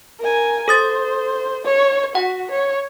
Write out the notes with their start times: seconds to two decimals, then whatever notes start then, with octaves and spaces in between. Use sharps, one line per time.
0.20 A#4 G#5
0.68 A4 C5 D#6 A6
1.65 C#5
2.15 F#4 F#5
2.51 C#5